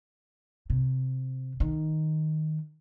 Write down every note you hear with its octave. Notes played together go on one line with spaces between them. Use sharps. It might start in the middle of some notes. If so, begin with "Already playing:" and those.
C3
D#3